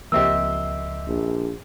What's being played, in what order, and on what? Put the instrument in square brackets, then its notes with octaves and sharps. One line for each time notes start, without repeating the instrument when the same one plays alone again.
[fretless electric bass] C#2 F3 [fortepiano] A#3 C4 G4 [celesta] D#5 E5 E6
[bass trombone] A#1